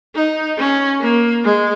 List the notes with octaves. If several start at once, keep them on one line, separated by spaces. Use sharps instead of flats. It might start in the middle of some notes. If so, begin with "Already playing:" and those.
D#4
C#4
A#3
G#3